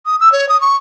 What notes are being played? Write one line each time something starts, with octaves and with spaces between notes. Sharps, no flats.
D#6
E6
C#5
D#6
C#6